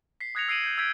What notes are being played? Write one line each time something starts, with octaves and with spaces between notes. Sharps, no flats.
B6 C7
D#6 F#6 G#6 A#6 C#7 F7
E6 C7 D7 D#7 F#7
G6 G#6
E6 G6 G#6 B6 D7 F7